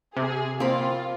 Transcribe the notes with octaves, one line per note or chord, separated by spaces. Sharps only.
C3 G#4
A#3 C4 F4 B5